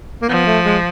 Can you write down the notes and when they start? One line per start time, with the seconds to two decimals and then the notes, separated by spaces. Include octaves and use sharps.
0.22 A#3
0.29 F3 B3
0.46 A3
0.65 G#3